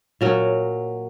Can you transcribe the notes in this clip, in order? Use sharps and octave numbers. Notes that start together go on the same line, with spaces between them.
A#2 F#3 A#4